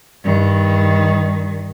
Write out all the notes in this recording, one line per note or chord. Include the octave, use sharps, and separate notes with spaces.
G2 D#3